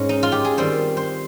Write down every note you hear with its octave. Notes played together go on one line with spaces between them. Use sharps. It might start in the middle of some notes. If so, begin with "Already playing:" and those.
Already playing: G#2 G#3 C#4
D#4
F4
G4
G#4
D#3 G3 C4 D#4 C5
C5